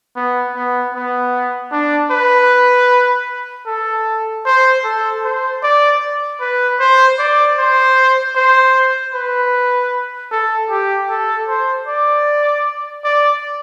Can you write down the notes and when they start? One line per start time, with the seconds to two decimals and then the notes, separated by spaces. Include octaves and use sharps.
0.16 B3
0.55 B3
0.94 B3
1.71 D4
2.11 B4
3.67 A4
4.46 C5
4.84 A4
5.24 C5
5.63 D5
6.41 B4
6.80 C5
7.18 D5
7.58 C5
8.36 C5
9.14 B4
10.31 A4
10.70 G4
11.10 A4
11.49 C5
11.87 D5
13.05 D5